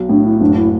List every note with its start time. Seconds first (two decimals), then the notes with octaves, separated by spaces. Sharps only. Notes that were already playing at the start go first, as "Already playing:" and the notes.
Already playing: B1
0.09 A2 D4
0.25 E4
0.41 F#1 D4
0.56 E4